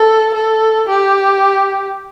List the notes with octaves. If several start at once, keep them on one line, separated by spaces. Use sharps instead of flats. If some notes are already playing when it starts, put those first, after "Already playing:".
Already playing: A4
A4
G4